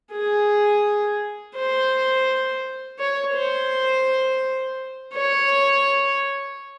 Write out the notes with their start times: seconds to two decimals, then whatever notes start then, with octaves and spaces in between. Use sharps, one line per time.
0.12 G#4
1.56 C5
2.99 C#5
3.34 C5
5.13 C#5